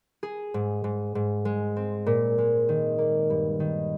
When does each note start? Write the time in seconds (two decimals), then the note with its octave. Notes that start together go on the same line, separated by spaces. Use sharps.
0.23 G#4
0.54 G#2
0.84 G#2
1.15 G#2
1.45 G#3
1.76 C4
2.06 A#2
2.38 G#3
2.69 D#3
2.98 A#3
3.30 G2
3.60 D#3